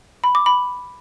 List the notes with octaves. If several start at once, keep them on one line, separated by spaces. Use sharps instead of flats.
B5
D6
B5